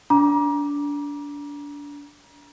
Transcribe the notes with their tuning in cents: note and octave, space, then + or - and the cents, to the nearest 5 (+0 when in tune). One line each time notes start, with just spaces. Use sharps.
D4 -25 A#5 +30 D6 +0